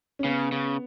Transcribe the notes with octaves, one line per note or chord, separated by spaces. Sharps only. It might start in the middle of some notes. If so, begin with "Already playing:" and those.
C#4
C#3 B3
C#3